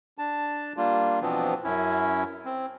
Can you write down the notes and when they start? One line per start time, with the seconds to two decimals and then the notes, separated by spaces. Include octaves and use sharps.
0.18 D4 A5
0.77 G3 A#3 D4 F4
1.21 B2 E3 F3 B3 C4 D4
1.64 F#2 C#4 E4
2.45 C4